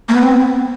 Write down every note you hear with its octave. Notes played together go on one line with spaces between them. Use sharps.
A#3
B3
C4